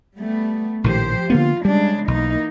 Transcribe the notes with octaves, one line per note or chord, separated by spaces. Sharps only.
G3 A3 B3
A#1 A2 D#3 F3 G4 C5
D3 A#3 B3 F4
C#3 G3 G#3 D4
B1 E3 A#3 D#4